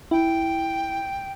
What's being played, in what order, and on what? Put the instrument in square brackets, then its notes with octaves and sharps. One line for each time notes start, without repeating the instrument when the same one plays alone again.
[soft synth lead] E4 [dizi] G5